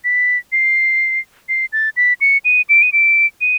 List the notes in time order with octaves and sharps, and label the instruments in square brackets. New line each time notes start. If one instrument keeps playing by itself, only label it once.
[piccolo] B6
C7
C7
A6
B6
C#7
D#7
D7
D#7
D7
D#7